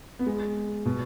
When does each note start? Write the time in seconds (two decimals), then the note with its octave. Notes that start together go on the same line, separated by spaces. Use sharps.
0.19 B3
0.26 G#3
0.86 B2